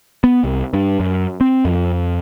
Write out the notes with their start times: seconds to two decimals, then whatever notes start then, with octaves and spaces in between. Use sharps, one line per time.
0.24 B3
0.44 C2
0.74 G2
1.00 F#2
1.41 C4
1.65 F2